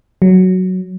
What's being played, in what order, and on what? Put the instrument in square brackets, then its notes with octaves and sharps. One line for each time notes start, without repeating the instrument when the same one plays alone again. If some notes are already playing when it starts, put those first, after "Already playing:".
[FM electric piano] F#3